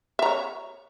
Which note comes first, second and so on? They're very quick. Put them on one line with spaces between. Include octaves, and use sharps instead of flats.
E5 A#5 C#5